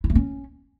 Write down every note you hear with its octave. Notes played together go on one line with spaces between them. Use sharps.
E4
A3
C#4